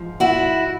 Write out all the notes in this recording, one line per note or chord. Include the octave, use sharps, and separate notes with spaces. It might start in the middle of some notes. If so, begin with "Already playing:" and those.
Already playing: G#2 F3
E4 F#4